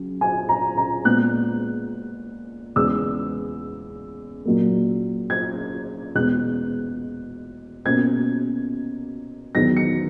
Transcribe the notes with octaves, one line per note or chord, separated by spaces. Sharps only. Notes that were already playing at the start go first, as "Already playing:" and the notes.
Already playing: C#3 F#3 C#4
G#5
A#5
A#5
A#2 G#3 B3 F#6
E2 C#3 G#3 B3 E6
A#2 F#3 A#3
G#6
E2 B2 G#3 B3 F#6
B2 A#3 C#4 G#6
E2 D#3 F#3 B3 A#6
C#7